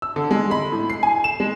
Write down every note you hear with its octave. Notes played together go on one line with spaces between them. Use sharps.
E6
D3
G#3
B5
A2
C7
G#5
E7
G#3